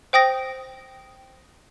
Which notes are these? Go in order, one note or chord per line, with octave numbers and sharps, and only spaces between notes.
C5 G5 D#6 A#6